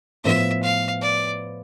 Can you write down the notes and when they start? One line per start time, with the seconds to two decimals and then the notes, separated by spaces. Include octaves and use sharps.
0.24 A2 F3 B3 E5
0.63 F5
1.02 D5